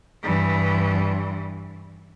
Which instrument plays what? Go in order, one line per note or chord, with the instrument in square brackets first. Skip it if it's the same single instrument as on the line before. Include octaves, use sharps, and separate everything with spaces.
[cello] G2 E3